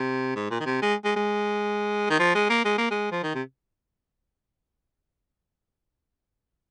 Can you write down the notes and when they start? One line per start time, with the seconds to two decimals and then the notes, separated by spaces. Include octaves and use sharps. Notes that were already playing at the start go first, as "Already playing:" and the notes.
Already playing: C3
0.36 G#2
0.51 A#2
0.60 D#3
0.66 C3
0.82 G#3
1.05 G#3
1.16 G#3
2.10 D#3
2.19 F3
2.35 G#3
2.50 A#3
2.65 G#3
2.78 A#3
2.91 G#3
3.11 F3
3.23 D#3
3.35 C3